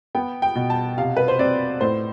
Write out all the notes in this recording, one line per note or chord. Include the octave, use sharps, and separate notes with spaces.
B3 G5
G5
B2
A5
C3 F5
B4
C5
C4 D5
A2 C5